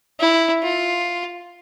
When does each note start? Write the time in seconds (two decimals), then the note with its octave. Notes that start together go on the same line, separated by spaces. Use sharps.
0.20 E4
0.63 F4